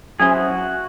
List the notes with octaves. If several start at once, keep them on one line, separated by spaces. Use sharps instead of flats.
F#3 C#4 E4 G#4 C5
F#4